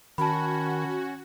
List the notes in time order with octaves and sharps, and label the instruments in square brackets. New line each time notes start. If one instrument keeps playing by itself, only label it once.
[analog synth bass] D#3 [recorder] C#4 [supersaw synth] F#4 [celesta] A5 B5